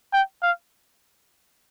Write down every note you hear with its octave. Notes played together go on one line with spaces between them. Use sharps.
G5
F5